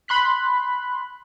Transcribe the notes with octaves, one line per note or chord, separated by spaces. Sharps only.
B5 C6 F#6 B6